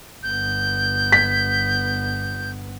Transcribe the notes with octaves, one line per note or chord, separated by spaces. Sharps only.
G1 B3 G6
B6